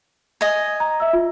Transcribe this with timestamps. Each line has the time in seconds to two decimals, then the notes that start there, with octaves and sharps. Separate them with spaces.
0.41 D#5 G#5
0.80 A#5
1.00 E5 E6
1.13 F4